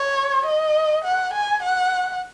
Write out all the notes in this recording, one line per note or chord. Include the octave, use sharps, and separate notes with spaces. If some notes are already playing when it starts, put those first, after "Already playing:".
Already playing: C#5
D#5
F#5
G#5
F#5